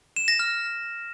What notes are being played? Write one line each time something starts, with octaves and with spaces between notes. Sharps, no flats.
E7
A#6
F6